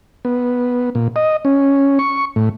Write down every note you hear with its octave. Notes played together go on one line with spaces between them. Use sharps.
B3
A#2
D#5
C#4
C#6
A2